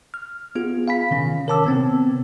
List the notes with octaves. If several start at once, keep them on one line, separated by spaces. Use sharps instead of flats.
F6
B3 F4 G#4
F5 G#5 B5 B6
C3 D#3 C#4
A#4 C#5 A5 D6 E6
C3 B3 C4